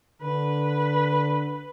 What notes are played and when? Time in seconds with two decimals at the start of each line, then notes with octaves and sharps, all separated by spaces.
0.22 D3 B4